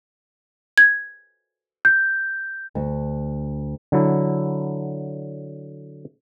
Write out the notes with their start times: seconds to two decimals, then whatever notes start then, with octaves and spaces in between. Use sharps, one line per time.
0.78 G#6
1.85 G6
2.75 D2
3.92 D3 F#3 E4